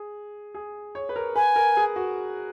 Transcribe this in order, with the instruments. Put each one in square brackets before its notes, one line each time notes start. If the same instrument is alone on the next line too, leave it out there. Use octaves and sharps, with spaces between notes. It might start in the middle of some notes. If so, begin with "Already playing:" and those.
Already playing: [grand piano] G#4
G#4
C#5
B4
A#4
[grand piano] B4 [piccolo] G#5
[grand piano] A#4
G#4
F#4